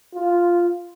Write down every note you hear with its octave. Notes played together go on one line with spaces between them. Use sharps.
F4